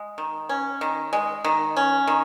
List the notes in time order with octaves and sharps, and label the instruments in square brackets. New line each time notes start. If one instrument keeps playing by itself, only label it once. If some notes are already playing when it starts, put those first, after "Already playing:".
Already playing: [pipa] G#3
D#3
C#4
D#3
G#3
D#3
C#4
D#3